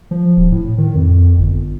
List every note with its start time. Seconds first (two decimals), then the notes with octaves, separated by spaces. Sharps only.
0.11 F3
0.37 D#1
0.52 A2
0.78 D#3
0.95 F2
1.38 G1